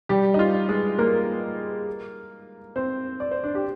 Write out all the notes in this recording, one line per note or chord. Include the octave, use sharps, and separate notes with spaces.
G3 G4
D#4
F4
G#3 G#4
A#3 A#4
C4 C5
D5
C5
D4 D5
G4